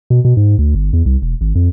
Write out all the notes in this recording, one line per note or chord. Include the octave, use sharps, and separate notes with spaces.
B2
B2
G#2
D2
G1
E2
C2
E1
G#1
F2